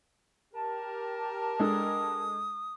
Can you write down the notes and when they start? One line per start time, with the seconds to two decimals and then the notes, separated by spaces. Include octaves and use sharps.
0.53 G4 A#4 A5
1.60 G#3 D4 A4 D#6